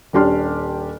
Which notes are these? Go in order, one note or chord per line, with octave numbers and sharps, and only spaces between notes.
D#1 C#4 D4 G4 C6 F6